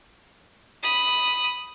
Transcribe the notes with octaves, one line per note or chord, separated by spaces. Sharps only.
B5 D#6